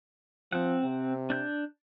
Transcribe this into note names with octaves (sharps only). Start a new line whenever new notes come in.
F3 C4 F#5
C3
D4 G6